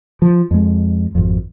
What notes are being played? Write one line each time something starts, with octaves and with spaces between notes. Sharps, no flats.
F3
F2 G#3
G#1 F2